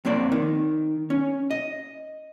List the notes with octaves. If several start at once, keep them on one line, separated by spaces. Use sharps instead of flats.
F2 A#3 C4 D5
D#3
C#4
D#5